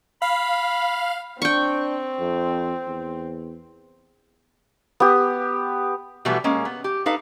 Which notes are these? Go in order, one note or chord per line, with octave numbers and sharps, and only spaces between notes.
F5 B5
C4 D4 G5 C#6
F2
E2
B3 G4
B2 E3 F#3 G3 A3 B3
G#3 A#3 C#4
B3
G4
D#4 A4 B4 F5